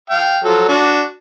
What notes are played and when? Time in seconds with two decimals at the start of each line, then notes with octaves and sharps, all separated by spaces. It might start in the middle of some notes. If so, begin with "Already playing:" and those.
0.10 F5 G5
0.44 F3 F#3 A4
0.69 D4 F#4